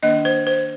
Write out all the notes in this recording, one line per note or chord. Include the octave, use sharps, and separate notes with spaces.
D#3 A#3 D4 D#5
C5
C5